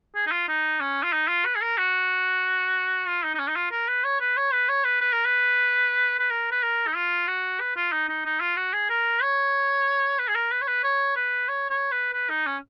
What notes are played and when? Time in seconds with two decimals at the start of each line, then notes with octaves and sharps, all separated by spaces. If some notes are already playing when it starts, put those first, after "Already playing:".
0.15 G#4
0.27 D#4
0.32 F4
0.49 D#4
0.80 C#4
1.04 F4
1.13 D#4
1.28 F4
1.45 B4
1.56 G#4
1.62 A#4
1.78 F#4
3.07 F4
3.24 D#4
3.35 D#4
3.39 C#4
3.48 D#4
3.56 F4
3.71 A#4
3.88 B4
4.04 C#5
4.20 B4
4.37 C#5
4.53 B4
4.69 C#5
4.84 B4
5.02 B4
5.13 A#4
5.25 B4
6.20 B4
6.31 A#4
6.52 B4
6.63 A#4
6.87 D#4
6.96 F4
7.28 F#4
7.60 B4
7.76 F4
7.92 D#4
8.09 D#4
8.26 D#4
8.41 F4
8.57 F#4
8.73 G#4
8.90 A#4
9.22 C#5
10.19 B4
10.28 G#4
10.35 A#4
10.52 B4
10.62 C#5
10.68 B4
10.84 C#5
11.16 B4
11.49 C#5
11.70 C#5
11.92 B4
12.13 B4
12.30 D#4
12.46 C#4